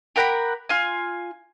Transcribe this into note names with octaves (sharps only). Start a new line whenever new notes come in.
G4 A#4 F#5 B5
F4 G#5